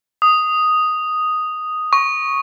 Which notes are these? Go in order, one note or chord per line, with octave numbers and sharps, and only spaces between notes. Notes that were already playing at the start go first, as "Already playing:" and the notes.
D#6
C#6